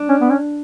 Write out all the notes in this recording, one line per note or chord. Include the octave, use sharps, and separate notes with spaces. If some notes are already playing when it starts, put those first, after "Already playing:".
Already playing: D4
C#4
B3
C#4